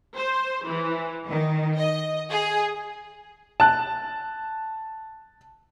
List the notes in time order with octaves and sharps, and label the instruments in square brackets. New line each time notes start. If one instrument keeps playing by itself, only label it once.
[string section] C5
E3
D#3
D#5
G#4
[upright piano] A5 F#6